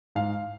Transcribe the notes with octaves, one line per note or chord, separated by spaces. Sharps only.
G#2 F5